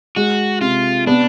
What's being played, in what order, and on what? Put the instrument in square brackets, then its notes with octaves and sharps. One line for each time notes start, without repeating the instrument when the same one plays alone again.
[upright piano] G#3 [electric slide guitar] F#4
[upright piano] C3 [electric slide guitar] F4
[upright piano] B3 [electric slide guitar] D4